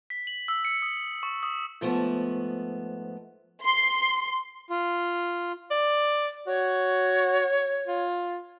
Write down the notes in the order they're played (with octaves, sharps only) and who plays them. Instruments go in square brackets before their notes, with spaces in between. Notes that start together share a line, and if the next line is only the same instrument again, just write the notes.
[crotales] B6
F#7
E6
C#7
D#6
C#6
D#6
[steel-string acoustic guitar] G#2 F3 A3 B3
[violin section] C6
[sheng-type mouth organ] F4
[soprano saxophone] D5
[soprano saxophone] F#4 [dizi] C#5
[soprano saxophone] F4